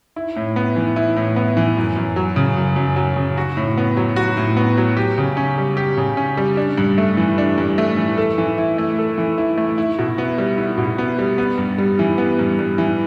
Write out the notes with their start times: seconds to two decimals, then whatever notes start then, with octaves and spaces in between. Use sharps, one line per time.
0.16 E4
0.36 A2
0.56 B3
0.76 E3
0.96 E4
1.16 A2
1.36 B3
1.57 E3
1.77 F#2
1.96 F#2
2.16 F#3
2.36 C#3
2.57 F#2
2.76 F#2
2.96 F#3
3.16 C#3
3.37 F#4
3.57 A2
3.78 B3
3.97 F#3
4.16 F#4
4.37 A2
4.57 B3
4.78 F#3
4.97 G4
5.18 C#3
5.37 C#4
5.58 G3
5.77 G4
5.97 C#3
6.17 C#4
6.37 G3
6.57 D4
6.78 G2
6.98 A3
7.17 E3
7.38 D4
7.58 G2
7.78 A3
7.97 E3
8.18 A4
8.38 E3
8.58 E4
8.78 A3
8.98 A4
9.18 E3
9.38 E4
9.58 A3
9.78 E4
9.99 B2
10.18 B3
10.38 G3
10.58 E4
10.78 B2
10.98 B3
11.19 G3
11.38 B3
11.58 G2
11.78 G3
11.99 E3
12.18 B3
12.39 G2
12.59 G3
12.78 E3